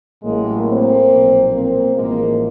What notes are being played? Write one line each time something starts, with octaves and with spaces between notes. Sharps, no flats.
A1 A2 F#3 G#3 A#3
A#3 C4
B1 A#2 F3
A#3 C4
A1 G#2 F3 G#3 A#3